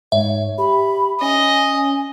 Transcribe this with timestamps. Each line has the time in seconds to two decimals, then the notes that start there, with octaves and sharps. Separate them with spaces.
0.12 G#2 C#5 E5
0.58 G4 B5
1.21 C#4 D#5 G#5